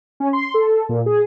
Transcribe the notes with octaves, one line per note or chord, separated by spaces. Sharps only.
C#4
C6
A4
A#2
G#4